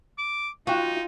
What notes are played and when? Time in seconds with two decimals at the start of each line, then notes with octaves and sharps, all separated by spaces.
0.18 D6
0.67 D#4 F4 F#4 F5 G5